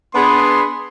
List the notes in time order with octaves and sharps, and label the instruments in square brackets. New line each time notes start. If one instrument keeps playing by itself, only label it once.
[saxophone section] B3 [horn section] D4 G#4 [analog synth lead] B5 [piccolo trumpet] C6